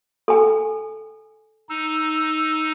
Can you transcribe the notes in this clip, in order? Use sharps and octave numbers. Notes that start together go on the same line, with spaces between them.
A4 G#5
D#4 E6